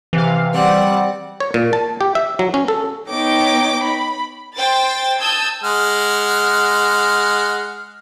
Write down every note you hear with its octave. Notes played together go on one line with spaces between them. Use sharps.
C3 E3 F5
G3 C4 D5 F#5
C#5
A#2
A5
G4
E5
F#3
C#4
A4
B3 D#4 C#5 G5 D6
B5
C5 G5 A6
A5 D#6 E6 G6 G#6
G#3 F#5 F6